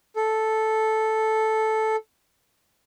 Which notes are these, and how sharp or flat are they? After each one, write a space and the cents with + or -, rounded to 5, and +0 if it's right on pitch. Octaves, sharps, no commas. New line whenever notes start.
A4 -5